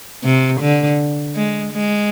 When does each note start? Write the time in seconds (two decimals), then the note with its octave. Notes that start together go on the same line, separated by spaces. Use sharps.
0.24 C3
0.61 D3
1.35 G#3
1.73 G#3